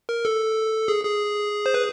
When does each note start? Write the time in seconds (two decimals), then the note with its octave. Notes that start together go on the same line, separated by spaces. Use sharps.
0.09 A#4
0.25 A4
0.88 G#4
1.05 G#4
1.66 C5
1.74 B4